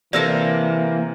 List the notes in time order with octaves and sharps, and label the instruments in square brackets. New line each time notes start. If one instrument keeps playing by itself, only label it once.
[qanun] C3 A4 A5 [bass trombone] E3 [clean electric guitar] A#3 [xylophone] D5 E6 A#6